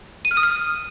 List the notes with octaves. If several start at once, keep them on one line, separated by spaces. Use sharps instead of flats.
D#7
F6
D#6
F6